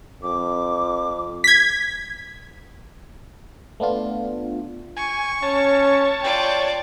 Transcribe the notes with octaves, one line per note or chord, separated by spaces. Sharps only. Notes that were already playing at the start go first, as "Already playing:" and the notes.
F2 D6
G#6 B6
A3 B3 D4 F4
G#5 C#6
C#4 C#5 A5
F4 D5 G5